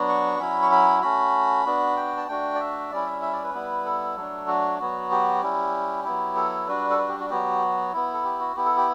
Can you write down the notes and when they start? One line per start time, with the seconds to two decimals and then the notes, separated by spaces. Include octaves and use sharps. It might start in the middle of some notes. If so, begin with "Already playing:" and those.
Already playing: F#3 B3 D4 F#4
0.09 C#6
0.40 F#3 C#4 E4 B5
0.63 C#6
0.71 B5
1.02 A3 C#4 F#4 B5
1.66 B3 D4 F#4
1.96 G5
2.17 A5
2.28 A3 D4 F#4 G5
2.55 D5
2.60 E5
2.91 G3 C#4 E4 D5
3.06 E5
3.22 E5
3.32 D5
3.43 B4
3.54 G3 B3 E4
3.85 A4
4.16 F#3 A3 D4
4.48 F#4
4.79 F#3 B3 F#4
5.11 G4
5.42 G3 C#4 E4
6.05 F#3 B3 E4
6.35 A4
6.67 G3 D4 F#4 B4
6.90 A4
6.98 B4
7.09 G4
7.20 F#4
7.30 F#3 B3 F#4 G4
7.93 B3 E4
8.14 A4
8.24 G4
8.40 F#4
8.56 B3 E4 G4
8.65 A4
8.77 G4